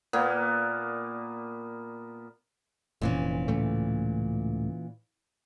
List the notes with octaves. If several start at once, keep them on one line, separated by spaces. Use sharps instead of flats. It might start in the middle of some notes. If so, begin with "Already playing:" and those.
A#2 A#3 B3
F1 A#2 E3 C#4
C#2 A2 A3